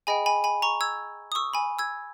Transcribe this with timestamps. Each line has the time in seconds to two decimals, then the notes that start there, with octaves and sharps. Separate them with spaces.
0.07 G#4 D#5 G5 G#5 B5
0.26 G#5 B5
0.44 G#5 B5
0.62 A#5 C#6
0.81 E6 G#6
1.32 D#6
1.35 C#6 E6
1.54 G#5 B5
1.79 E6 G#6